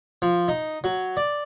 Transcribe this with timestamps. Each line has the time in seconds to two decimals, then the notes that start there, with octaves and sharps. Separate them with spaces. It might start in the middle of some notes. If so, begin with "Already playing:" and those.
0.22 F3
0.48 D#4
0.84 F#3
1.17 D5